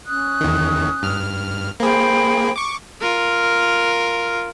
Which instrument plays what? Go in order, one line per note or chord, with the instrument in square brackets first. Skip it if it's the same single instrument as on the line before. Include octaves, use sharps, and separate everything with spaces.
[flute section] C#4 D#6 F#6
[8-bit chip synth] E2 D#3
G2 F6
[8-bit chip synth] A#3 G#4 [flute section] C5 G5 B5
[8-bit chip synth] C#6 D6
[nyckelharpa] F4 A#4